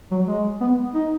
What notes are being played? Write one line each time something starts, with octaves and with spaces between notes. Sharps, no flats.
F#3
G#3
B3
D#4